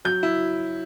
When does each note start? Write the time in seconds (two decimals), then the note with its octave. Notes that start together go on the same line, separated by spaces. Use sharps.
0.05 F#3 G6
0.23 E4